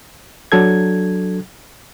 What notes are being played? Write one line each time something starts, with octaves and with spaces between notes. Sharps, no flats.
F#3 D4 A4 G#6